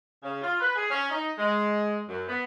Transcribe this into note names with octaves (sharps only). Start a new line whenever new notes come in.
C#3
F4
B4
G#4
C#4
D#4
G#3
F#2
B3